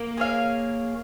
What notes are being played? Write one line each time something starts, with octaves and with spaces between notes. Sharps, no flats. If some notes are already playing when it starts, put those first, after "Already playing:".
Already playing: A#3
G#4 C#5 F5